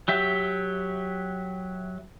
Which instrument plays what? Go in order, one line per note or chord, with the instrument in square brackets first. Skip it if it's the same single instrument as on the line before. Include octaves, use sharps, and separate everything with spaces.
[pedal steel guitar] F#3 G4 E5